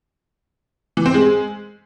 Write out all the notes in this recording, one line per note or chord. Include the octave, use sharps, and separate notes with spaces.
E3
C4
G#3